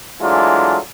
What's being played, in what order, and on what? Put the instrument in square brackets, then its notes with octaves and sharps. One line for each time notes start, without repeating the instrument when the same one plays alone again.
[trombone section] E3 F#3 G#3 A3 D4 F4